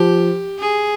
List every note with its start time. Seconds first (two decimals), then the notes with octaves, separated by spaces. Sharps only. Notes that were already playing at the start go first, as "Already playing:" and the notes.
Already playing: F3 G4
0.59 G#4